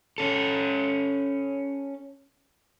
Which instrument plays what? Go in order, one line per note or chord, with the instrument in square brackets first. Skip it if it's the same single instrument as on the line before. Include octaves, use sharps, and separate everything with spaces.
[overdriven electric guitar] C#4 A4